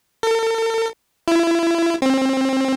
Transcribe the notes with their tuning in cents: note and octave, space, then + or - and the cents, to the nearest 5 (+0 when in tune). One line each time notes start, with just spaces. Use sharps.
A4 +45
E4 +30
C4 +25